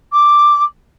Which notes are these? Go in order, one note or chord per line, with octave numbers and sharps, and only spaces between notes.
D6